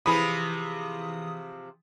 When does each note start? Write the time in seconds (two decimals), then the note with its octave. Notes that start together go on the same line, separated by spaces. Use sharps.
0.06 C3 E3 F3 G#4 B5 D#6